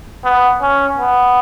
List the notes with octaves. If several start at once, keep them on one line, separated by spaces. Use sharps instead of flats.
B3
C#4
B3